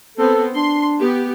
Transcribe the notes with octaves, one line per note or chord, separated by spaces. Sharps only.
B3 C4 A4
D4 C6
B3 G4